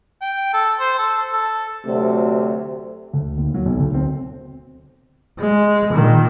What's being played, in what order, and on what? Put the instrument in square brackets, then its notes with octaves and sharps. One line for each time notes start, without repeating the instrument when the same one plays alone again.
[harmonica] G5
A4
C5
A4
A4
[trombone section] D2 C3 F#3 A3
[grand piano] D2
D#2
F#3
B1
D2
C4
[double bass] G#3
A#2 D#3